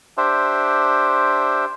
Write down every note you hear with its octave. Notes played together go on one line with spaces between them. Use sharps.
D4 G4 C5 E5